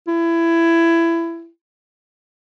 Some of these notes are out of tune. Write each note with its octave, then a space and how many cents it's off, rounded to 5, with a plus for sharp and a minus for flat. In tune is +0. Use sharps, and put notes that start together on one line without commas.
E4 +20